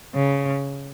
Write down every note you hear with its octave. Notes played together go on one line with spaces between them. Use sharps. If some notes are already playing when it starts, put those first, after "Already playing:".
C#3